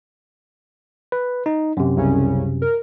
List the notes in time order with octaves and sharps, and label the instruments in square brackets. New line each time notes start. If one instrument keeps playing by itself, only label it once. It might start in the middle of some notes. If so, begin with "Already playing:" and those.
[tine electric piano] B4
D#4
F#2 C3
[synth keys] C2 C#3 C#4
A#4